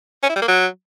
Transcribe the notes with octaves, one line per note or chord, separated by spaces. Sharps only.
C#4
E4
G3
A#3
F#3